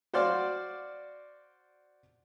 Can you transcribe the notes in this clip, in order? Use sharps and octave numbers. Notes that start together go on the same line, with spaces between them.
F#4 C5 D5 F5